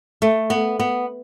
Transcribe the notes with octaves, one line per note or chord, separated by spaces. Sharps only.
A3
B3
B3